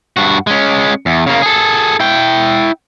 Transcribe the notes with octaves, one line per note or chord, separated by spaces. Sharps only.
G2 F#4
G#3 C#4
E2
C#3 A#3
G#4 A4
E4 G5